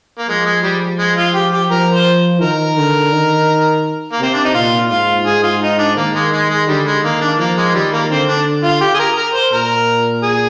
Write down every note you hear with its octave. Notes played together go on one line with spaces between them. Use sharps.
A#3
F3 G#3
G#3
G3
G#3
F4
G4
G4
F3 A#4
C5
D#3 A#4
D3
D#3
A#3
C3 C4
D4
D#4
A#2 F4
G#2 F4
G#2 G#4
F4
D#4
D4
D#3 A#3
G#3
G#3
G#3
D3 G3
G#3
D#3 A#3
D4
F3 A#3
G#3
D#3 G3
A#3
D3 C4
D4
F4
G4
G#4
A#4
A#4
C5
A#2 A#4
G#4